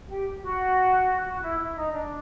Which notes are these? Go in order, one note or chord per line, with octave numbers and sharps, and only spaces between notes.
G4
F#4
F#4
E4
E4
D#4
D4